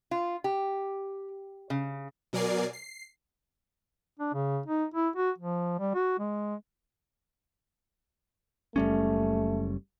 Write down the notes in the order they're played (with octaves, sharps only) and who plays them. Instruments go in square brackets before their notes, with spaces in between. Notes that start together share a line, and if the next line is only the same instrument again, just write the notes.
[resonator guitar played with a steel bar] F4
G4
C#3
[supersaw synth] B2 F#3 A#4 D5 G#5 C7
C7
[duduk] D4
C#3
D#4
E4
F#4
F3
G3
F#4
G#3
[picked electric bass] F#1 G3 C#4 [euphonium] A3